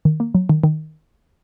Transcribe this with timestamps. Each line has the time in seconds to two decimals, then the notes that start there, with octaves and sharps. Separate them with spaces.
0.05 D#3
0.20 A#3
0.35 F#3
0.49 D#3
0.64 D#3